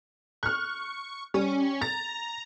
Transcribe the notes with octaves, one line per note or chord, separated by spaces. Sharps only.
C#6 F6 F#6
G3 C#4
A#5 A6